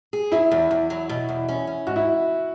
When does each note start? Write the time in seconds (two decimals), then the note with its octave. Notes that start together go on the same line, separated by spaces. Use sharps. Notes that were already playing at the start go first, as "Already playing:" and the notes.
0.13 G#4
0.32 F#3 E4
0.52 E2
0.71 E2
0.90 F#3
1.09 B2
1.29 E2
1.48 C#4
1.67 C#4
1.87 G#2 F#4
1.96 E4